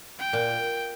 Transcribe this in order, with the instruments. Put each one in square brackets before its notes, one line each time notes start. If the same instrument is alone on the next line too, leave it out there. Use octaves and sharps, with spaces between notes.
[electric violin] G5
[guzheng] A#2